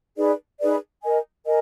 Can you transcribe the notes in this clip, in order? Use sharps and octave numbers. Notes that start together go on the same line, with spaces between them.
D#4 G#4 B4 D5
D#4 G#4 B4 D5
A#4 D#5 G#5
A#4 D#5 G#5